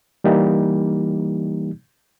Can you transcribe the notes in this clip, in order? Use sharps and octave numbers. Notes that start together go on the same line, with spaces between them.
E3 G3 A#3 D#4 G4